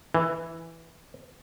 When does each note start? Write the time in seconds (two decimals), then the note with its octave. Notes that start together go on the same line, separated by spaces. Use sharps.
0.15 E3